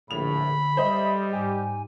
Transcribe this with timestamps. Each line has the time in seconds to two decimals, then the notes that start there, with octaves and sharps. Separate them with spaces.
0.11 A#1 A2 D3 A4 B5 F7
0.77 G3 A4 C5 D#5 E5
1.32 G#2 G4 G#5